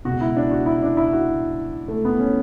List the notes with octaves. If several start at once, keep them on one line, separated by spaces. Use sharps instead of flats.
B2 F#4
C#2
E4
D4
F#4
E4
D4
E4
F#4
A3
B3
C#4